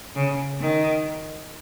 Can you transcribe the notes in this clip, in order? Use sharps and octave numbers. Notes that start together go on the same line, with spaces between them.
C#3
D#3